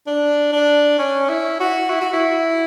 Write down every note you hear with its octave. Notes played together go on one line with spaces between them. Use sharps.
D4
D4
C#4
E4
F#4
E4
F#4
E4